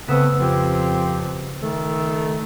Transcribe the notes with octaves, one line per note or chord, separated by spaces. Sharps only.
C#3 A3 B3 C4 B4 E6
F2 C4 G4
D#3 A3